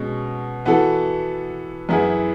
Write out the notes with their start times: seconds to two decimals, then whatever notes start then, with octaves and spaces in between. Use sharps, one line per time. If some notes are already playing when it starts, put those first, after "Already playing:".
Already playing: B2 G#3 C#4
0.66 E3 B3 F#4 A4
1.89 F#2 E3 B3 E4 G#4